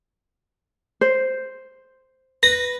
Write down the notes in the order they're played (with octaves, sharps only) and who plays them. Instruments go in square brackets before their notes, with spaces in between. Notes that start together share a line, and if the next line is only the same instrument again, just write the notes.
[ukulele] C5
[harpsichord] B4 [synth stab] A#6